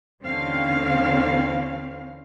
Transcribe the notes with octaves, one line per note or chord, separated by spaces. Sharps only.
D#2 D3 E3 C4 C#4 F5